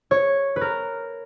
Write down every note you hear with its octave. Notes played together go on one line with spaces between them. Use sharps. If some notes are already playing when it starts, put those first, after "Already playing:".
C#5
B4
A#4